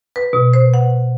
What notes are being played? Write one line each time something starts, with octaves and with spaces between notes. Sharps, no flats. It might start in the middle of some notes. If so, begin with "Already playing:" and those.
B4
B2
C5
F#5